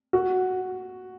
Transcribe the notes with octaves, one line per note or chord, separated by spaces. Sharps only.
F#4